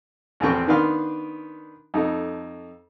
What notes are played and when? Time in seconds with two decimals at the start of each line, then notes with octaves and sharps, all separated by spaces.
0.40 E2 A2 F3 C4 G5 C#6
0.67 D#3 B3 D4 F5 C6
1.94 F2 D#4 A4